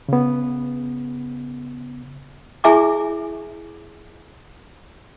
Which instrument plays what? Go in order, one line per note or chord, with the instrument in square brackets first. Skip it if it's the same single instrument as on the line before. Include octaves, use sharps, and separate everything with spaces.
[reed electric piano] C#3 B3
[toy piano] E4 G#4 E5 G#5 C#6 D6